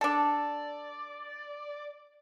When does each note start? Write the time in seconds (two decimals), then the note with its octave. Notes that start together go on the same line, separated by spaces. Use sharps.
0.01 D4 A4 D5